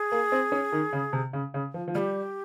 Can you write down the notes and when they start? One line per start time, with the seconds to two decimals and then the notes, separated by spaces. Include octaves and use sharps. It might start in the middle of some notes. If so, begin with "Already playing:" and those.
Already playing: G#4
0.12 A#3
0.32 C4
0.52 C#4
0.72 D#3
0.93 C#3
1.13 C3
1.33 C#3
1.54 C#3
1.74 F3
1.88 F3
1.95 G3 G4 G#4